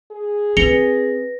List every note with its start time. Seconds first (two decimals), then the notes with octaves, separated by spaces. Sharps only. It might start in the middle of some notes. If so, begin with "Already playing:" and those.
0.11 G#4
0.57 C4 B4 A#6 C#7 F7 G7